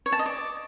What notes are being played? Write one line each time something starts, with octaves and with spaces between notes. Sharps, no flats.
C#5
A5
D#5
D5